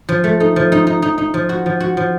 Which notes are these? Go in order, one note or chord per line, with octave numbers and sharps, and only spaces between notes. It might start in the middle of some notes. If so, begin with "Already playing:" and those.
F3
A3
D#4
F3
D#4
D#4
D#4
D#4
F3
F#4
F3
F#4
F3